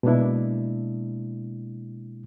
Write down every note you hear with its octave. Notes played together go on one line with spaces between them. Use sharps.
B2 G#3 A#3 D4 E4